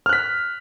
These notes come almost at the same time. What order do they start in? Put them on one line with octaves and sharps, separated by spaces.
F6 F#6 B6